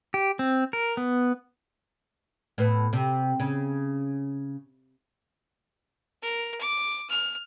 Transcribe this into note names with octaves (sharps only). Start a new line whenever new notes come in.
G4
C4
A#4
B3
A2 B3
C3
C#3
A#4
D6
F6